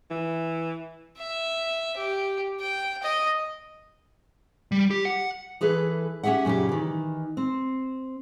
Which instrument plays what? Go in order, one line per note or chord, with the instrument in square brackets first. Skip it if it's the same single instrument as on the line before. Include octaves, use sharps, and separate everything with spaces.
[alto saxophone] E3
[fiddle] E5
G4
G5
D#5
[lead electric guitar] G3
G4
F#5
[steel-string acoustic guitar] E3 G#4 A4 B4
C#4 G4 G#4 E5 F#5
F#2 A#2 C#3 C#4 G4
D#3 E3
C4